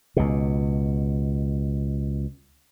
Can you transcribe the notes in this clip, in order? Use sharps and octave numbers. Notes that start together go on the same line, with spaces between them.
C#2 B2